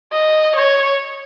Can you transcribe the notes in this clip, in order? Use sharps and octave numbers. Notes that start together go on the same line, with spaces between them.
D#5
C#5